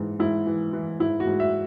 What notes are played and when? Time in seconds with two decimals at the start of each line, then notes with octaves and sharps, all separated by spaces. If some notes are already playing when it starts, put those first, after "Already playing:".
Already playing: G#2 E3
0.20 G#2 E4
0.47 E3
0.73 E3
1.00 G#2 E4
1.20 F#4
1.27 G#2
1.40 E5